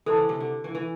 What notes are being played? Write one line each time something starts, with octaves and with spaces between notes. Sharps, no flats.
E3 A4 C5 A5
D3
C3
D3
E3
E3